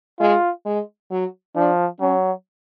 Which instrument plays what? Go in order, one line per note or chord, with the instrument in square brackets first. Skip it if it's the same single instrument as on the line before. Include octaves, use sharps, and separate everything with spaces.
[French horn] G#3 [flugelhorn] F4
[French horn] G#3
F#3
[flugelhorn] F3 [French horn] D4
[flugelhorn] F#3 [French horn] C#4